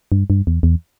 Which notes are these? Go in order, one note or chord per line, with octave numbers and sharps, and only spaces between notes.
G2
G2
E2
E2